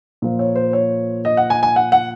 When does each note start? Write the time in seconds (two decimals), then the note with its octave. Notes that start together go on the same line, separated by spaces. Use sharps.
0.22 A#2 F3
0.39 C#5
0.56 C5
0.73 C#5
1.25 D#5
1.37 F#5
1.50 G#5
1.63 G#5
1.76 F#5
1.92 F#5